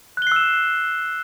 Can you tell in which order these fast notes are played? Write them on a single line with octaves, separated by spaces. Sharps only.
F#6 G7 C7 E6 E7